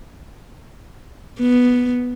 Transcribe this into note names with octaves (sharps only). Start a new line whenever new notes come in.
B3